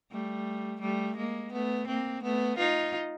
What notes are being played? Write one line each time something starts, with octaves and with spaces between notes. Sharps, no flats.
G3 A3
G3 A3
G#3 A#3
A3 B3
A#3 C4
A3 B3
D#4 F4